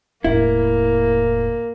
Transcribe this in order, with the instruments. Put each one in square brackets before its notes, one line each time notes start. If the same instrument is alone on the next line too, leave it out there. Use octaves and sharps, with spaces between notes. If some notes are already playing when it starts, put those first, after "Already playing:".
[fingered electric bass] E1 A2 [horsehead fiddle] A#3 [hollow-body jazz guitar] E4